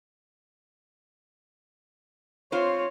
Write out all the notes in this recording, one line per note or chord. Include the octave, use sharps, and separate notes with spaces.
C4 F4 C5 C#5